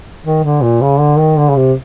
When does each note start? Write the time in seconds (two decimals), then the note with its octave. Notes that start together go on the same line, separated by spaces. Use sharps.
0.25 D#3
0.44 D3
0.62 A#2
0.81 C#3
0.99 D3
1.19 D#3
1.37 D3
1.49 C#3
1.56 C3